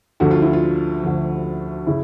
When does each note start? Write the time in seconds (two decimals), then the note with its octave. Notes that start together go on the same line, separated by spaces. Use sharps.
0.20 D2 D3 F3 F#4
0.31 F4
0.42 E4
0.53 F4
1.03 D2 D3 F3
1.87 C#3 E4